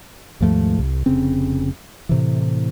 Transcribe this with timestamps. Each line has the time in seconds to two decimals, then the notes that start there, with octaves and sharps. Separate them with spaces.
0.41 D#2 G#2 F3 A3
0.79 C2
1.06 F1 C#3 C4
2.09 A2 C3 E3